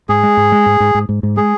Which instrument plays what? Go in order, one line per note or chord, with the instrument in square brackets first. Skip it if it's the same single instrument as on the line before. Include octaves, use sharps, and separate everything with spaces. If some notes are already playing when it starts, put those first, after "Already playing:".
[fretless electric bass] G#2 [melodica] G#4
[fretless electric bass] G#3
G#2
G#3
G#2
G#2
G#2
G#2
G#2
[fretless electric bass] G#3 [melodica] G#4